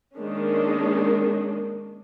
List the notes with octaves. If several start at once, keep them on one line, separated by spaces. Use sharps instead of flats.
D#3 G#3 A#3 C#4 D4